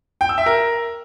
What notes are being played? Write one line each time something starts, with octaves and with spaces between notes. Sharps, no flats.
G5
E6
E5
A#4